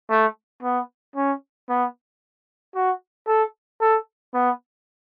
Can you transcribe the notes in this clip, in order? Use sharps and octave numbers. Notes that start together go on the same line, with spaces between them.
A3
B3
C#4
B3
F#4
A4
A4
B3